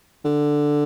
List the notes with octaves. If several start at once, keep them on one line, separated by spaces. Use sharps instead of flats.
D3